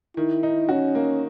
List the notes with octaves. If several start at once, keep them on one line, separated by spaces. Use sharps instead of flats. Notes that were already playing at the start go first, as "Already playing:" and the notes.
D#3 E4
D#4
C#4 F#4
A#3